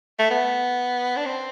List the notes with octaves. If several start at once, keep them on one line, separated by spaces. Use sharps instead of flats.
A3
B3
D4
C4